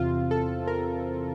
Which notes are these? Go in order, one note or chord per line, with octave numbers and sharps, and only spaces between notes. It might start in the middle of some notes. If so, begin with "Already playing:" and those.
Already playing: E2 C3 C4 F4
A4
A#4